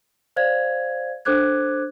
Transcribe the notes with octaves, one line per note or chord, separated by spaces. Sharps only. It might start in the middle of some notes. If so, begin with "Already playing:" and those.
C5 D5 F5 G#6
D4 A4 C5 D6 F#6 G#6